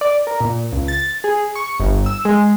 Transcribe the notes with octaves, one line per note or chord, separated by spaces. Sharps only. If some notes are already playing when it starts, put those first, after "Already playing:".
D5
A#4
A#2
C#2
A6
G#4
C#6
G1
E6
G#3